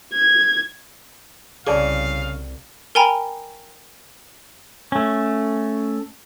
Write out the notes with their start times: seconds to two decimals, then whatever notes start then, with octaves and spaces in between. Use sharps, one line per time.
0.14 G#6
1.67 C2 C#3 G#4 D5 F5 A5
2.95 A#4 G5 G#5 A#5 B5
4.92 A3 C#4